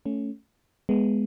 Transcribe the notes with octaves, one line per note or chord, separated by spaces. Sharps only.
A3 C#4
G#3 B3